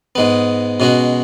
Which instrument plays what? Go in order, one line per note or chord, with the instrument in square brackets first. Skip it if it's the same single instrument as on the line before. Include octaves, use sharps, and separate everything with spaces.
[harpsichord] G#2 G#3 B3
B2 G#3 C#4 F#4